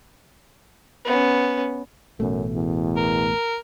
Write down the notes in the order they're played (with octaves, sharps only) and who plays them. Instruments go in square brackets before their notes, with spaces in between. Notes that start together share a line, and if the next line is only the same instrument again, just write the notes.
[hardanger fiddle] B3 C#4
[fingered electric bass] A1 B2 A3 [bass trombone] F#2
[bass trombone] E2
[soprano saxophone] A#4